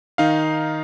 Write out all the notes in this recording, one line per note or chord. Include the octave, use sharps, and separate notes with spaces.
D#3 D#4 F5